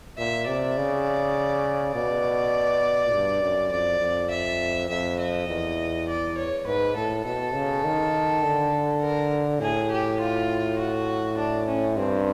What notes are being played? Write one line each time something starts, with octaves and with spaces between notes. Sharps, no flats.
A#2 E5
C3 D5
C#3
B2 D5
G2
F#2
F2 D5
F2
E5
F2 E5
D#5
E2
D5
C#5
G#2 B4
A2 A4
B2 A4
C#3
D#3
D3
A#4
A2 G#4
G4
F4
F#4
D4
C#4
G2 C4